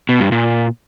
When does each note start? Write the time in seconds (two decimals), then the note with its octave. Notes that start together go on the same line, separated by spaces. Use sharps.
0.09 B2
0.20 G2
0.32 A#2